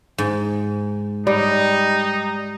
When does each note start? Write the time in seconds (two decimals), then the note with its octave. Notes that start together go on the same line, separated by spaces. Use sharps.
0.18 G#2
1.27 G3 D#4